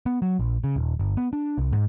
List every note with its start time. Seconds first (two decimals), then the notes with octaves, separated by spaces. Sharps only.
0.06 B3
0.22 F#3
0.39 A#1
0.64 C#3
0.76 D#1
0.99 G1
1.17 B3
1.33 D4
1.58 C2
1.73 G#2